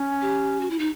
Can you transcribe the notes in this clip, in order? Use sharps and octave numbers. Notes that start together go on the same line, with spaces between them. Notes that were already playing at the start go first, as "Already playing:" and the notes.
Already playing: C#4
G4
F#4
E4
D#4